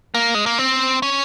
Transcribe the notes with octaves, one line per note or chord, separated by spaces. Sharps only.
A#3
G#3
A#3
C4
C#4